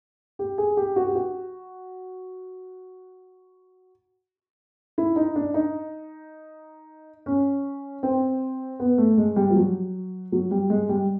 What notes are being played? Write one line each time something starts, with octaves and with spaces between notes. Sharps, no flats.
G4
G#4
G4
F#4
G4
F#4
E4
D#4
D4
D#4
C#4
C4
B3
A3
G#3
G3
F3
F#3
F#3
G3
G#3
G3